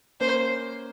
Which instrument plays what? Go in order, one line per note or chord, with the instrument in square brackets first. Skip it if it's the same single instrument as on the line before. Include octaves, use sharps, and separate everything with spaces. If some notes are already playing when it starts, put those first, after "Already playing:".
[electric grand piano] A#3 C#4 [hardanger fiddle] C5